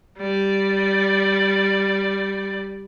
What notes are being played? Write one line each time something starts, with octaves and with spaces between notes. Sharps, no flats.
G3 D5